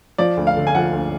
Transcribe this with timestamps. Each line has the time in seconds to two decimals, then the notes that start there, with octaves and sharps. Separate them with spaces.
0.18 F3 D5
0.37 D2
0.47 F5
0.57 D3
0.67 G#5
0.75 F3 F#5
0.93 D2